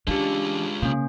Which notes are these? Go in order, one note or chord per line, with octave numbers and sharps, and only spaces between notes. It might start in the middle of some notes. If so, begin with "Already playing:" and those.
E3 G#3 C#4 D4 F4 G4
C#3 A#3 C#4